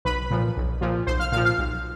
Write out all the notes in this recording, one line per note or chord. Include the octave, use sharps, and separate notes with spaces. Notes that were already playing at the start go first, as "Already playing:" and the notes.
B1 B4 B5
A#2 F3
B1
A#2 F3
B1 C5 C6
F5 F6
A#2 F3 F5 F6
F5 F6
B1